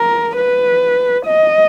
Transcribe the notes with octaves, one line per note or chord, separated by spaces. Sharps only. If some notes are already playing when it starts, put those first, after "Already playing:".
Already playing: A#4
B4
D#5